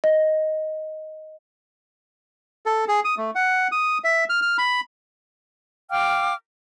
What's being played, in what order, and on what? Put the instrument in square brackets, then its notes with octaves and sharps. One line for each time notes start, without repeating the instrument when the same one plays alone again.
[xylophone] D#5
[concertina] A4
G#4
D#6
A3
F#5
D#6
E5
F6
F6
B5
[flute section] F5 G5 D6 F6